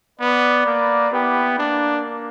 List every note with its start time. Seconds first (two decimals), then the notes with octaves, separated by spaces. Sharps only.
0.20 B3 B4 D5
0.66 A#3
1.12 B3 E4 G4
1.59 A#3 D4